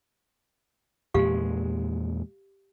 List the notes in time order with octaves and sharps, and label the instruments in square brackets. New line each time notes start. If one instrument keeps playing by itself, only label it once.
[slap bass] E2 A#2 G#3 [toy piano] G4 F5